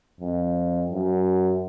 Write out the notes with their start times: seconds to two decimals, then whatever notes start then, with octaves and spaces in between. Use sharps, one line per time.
0.20 F2
0.91 F#2